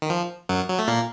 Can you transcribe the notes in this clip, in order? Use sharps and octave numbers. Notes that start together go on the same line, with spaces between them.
D#3
F3
F#2 F#3
F#3
A3
A#2 A#3